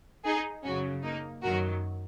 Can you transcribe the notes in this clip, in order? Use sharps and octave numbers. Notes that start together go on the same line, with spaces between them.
D#4 G#4
F#2 C#3 F#3 C#4 F#4
A#3 D#4
F#2 D#3 F#3 F#4 A#4